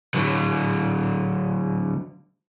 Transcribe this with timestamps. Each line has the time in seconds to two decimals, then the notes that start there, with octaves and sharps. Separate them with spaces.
0.14 D3 F#3